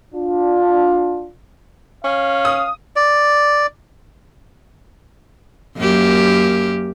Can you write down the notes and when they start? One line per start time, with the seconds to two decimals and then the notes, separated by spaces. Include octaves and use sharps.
0.14 D4 F4
2.04 C#4 F5
2.45 D#6
2.96 D5
5.77 F#2 A#3 G4